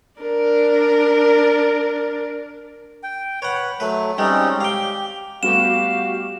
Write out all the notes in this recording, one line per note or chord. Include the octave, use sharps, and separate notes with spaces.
D4 A#4
G5
B4 C#5 F#5
F#3 A3 B4
G3 G#3 C4 C#4 D#4
G4 F5 G5
G3 A3 B3 F#4 G4 F5 E7